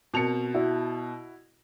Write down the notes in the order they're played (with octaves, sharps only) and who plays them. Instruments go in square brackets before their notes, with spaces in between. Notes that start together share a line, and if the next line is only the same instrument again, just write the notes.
[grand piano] B2 A5 F7 [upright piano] C4 A#4 C#7
[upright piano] E4 F#4